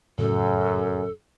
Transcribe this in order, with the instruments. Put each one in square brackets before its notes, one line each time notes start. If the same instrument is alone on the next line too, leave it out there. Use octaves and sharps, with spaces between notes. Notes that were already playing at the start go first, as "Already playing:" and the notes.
[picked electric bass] F1 A2 C#3 [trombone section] F#2 [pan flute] A4